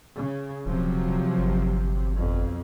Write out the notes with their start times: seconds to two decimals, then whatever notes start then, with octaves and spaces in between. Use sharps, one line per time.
0.17 C#3
0.66 D#1 C3 F3 F#3
1.38 G1
2.16 B1 F2